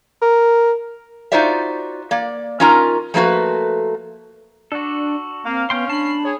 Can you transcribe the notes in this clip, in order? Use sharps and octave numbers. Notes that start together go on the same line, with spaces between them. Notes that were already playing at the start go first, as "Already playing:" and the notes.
A#4
D#4 F4 F#4 C5 D5 E5
A#3 D5
C#4 D#4 F4 A#4 A#5
F3 A3 A#3 F#4 B4
D4 F#4 A4
A#3 C4 F5
B3 C#4 G5 C6
D4 A5 B5 C7
G#4 C#5